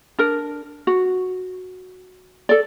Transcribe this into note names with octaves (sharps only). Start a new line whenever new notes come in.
D4 A#4
F#4
A4 D5